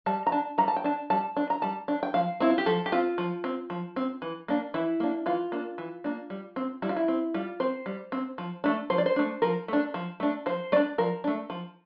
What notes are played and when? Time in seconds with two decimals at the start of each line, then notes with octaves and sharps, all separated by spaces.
0.06 G3 A5
0.27 A#5
0.32 D4 A5
0.58 G3 A#5
0.68 A5
0.76 G5
0.84 D4 A5
1.10 G3 A5
1.37 D4
1.50 A#5
1.62 G3 A5
1.88 D4
2.03 G5
2.14 F3 F5
2.40 C4 E4
2.50 F4
2.58 G4
2.66 F3 A4
2.86 G4
2.92 C4 F4
3.18 F3
3.44 C4
3.70 F3
3.96 C4
4.22 E3
4.48 A#3 D4
4.74 E3 E4
5.00 A#3 D4
5.26 E3 F4
5.52 A#3 D4
5.78 E3
6.04 A#3 D4
6.30 G3
6.56 C4
6.82 G3 E4
6.89 F4
6.96 E4
7.08 C4
7.34 G3 F4
7.60 C4 C5
7.86 G3
8.12 C4
8.38 F3
8.64 A3 D4
8.90 F3 C5
8.98 D5
9.06 C5
9.16 A3 D4
9.42 F3 A#4
9.68 A3 D4
9.94 F3
10.20 A3 D4
10.46 F3 C5
10.72 A3 D4 D5
10.98 F3 A#4
11.24 A3 D4
11.50 F3